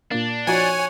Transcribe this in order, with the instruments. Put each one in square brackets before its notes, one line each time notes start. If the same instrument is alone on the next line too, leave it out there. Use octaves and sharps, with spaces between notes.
[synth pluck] A#2 A#3 [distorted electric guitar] D4
[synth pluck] F3 D#4 F#4 [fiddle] C#5 F#5 [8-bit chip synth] G#5